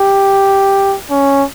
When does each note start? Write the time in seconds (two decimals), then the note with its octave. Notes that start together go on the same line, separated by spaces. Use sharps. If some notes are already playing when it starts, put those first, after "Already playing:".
Already playing: G4
1.11 C#4